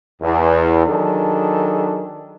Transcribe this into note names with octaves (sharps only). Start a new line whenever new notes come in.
E2
D#3 F#3 D4 G#4 A4